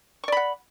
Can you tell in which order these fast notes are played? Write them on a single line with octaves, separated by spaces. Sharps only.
C#6 D5 B5 F#5